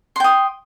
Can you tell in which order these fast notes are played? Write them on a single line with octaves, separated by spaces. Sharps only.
C6 G5 D#6